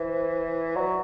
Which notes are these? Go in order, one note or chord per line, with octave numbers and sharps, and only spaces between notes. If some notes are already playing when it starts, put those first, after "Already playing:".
Already playing: E3 C5
C5
F#3 D5